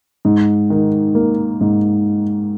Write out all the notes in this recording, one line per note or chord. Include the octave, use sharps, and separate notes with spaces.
G#2
D#3
A#3
G#2